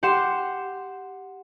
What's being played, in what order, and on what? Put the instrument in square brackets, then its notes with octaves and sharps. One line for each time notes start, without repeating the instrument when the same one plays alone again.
[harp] G4 F#5 C6 E7